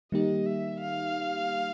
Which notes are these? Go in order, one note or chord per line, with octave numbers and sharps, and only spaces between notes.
D#3 G3 A#3 D#4 G4 D#5
E5
F5